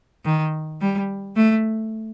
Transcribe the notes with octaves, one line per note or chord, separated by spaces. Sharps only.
D#3
G3
A3